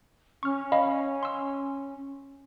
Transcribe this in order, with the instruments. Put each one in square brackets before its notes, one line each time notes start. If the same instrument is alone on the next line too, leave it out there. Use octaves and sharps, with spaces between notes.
[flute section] C#4 [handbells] C#6 F6
[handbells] D#5 F5 B5
C6 E6